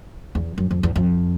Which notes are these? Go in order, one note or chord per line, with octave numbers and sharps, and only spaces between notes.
E2
F#2
F2
E2
F2